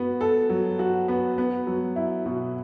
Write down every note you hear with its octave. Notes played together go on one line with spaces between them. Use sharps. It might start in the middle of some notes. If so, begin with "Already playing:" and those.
Already playing: B3 F#4
A4
F#3
F#4
B3
B3
F#3
E4
B2